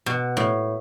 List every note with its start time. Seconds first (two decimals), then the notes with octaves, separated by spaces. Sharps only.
0.06 B2
0.37 A2